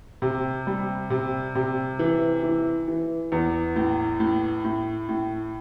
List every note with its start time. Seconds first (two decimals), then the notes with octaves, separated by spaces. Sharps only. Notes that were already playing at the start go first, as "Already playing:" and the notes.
0.22 C3
0.67 G3
1.10 C3
1.55 C3
1.99 E3
2.43 E3
2.88 E3
3.32 E2
3.76 A2
4.20 A2
4.65 A2
5.09 A2